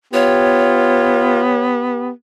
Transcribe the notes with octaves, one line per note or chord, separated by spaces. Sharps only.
B3 F4 G4 C#5